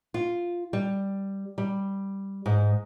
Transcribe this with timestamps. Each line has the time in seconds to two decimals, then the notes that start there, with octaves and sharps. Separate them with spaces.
0.14 F4
0.73 G3
1.58 G3
2.46 G#2